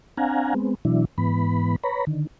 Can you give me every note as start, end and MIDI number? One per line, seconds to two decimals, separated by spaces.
0.17 0.54 60
0.17 0.54 62
0.17 0.54 77
0.17 0.54 78
0.17 0.54 80
0.17 0.54 82
0.54 0.75 56
0.54 0.75 59
0.54 0.75 60
0.85 1.05 47
0.85 1.05 52
0.85 1.05 54
0.85 1.05 62
0.85 1.05 64
1.18 1.76 44
1.18 1.76 52
1.18 1.76 59
1.18 1.76 83
1.84 2.05 71
1.84 2.05 73
1.84 2.05 82
1.84 2.05 83
2.07 2.27 50
2.07 2.27 51